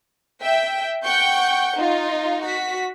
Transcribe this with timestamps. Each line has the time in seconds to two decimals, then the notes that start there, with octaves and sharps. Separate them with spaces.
0.43 E5 G5
1.04 F#5 G5 C#6 G6
1.78 D#4 F4
2.44 F#4 B6